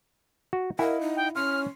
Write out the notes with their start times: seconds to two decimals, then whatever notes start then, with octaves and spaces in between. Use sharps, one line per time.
0.53 F#4
0.79 E4 A#4 D#5 F5 F#5
1.01 D#4
1.16 G5
1.35 C#4 C6 F6